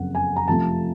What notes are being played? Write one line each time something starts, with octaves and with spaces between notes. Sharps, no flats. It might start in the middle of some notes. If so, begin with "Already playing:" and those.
Already playing: F#1 F2 F#5
G#5
A#5
F2 C3 F3 A3 A5